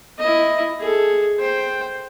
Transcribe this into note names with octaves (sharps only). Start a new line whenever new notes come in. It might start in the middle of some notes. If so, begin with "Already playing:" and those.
E4 D#5
G#4 A4
C5 G5